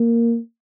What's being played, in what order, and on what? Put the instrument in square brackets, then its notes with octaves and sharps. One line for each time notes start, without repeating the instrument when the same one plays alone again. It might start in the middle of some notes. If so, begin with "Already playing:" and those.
Already playing: [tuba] A#3